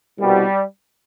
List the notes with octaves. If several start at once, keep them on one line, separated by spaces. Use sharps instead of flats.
C2 B2 G3